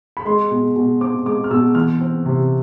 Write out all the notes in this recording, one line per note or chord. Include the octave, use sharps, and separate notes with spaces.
B5
G#3 C6
B2
B2
C4 D6
G#3 D6
F6
B2 E6
E3 F6
C4
C3